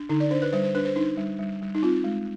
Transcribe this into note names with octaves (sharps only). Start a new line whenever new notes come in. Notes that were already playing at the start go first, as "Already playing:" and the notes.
Already playing: D4
D3 D#4
D5
D4 C5
B4
G3 C5
C5
D4 B4
C5
D4 D#4
G3
G3
G3
D#4
C4 F4
G#3